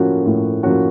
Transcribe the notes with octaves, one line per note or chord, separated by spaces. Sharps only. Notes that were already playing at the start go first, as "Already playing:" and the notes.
Already playing: A2 F3 A#3 C#4 F#4
A2
F3 A#3 C#4 F#4